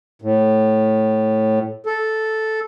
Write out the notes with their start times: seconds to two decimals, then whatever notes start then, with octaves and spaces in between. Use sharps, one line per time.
0.22 A2
1.86 A4